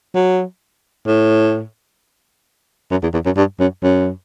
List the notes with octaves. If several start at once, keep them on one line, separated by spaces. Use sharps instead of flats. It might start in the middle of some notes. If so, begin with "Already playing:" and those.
F#3
A2
F#2
E2
E2
F#2
G2
F#2
F#2